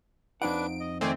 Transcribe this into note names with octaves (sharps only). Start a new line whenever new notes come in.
F2 D4 D#4 B4 F#5 D7
D#5
D#3 A3 C4 C5 D5 G#5